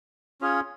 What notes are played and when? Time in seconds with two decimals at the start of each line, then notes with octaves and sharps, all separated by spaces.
0.41 C#4 F4 G#4 C#5